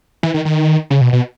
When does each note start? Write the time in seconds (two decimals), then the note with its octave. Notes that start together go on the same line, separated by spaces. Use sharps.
0.23 E3
0.34 D#3
0.45 D#3
0.90 C#3
1.01 B2
1.13 B2